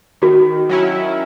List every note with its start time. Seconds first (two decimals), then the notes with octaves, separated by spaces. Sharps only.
0.22 D#3 F#4
0.69 F#3 C#4 E4